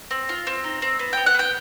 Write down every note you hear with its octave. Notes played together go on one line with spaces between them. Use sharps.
C4
F4
C4
D#4
C4
B3
B3 G5
F#5
B3 G5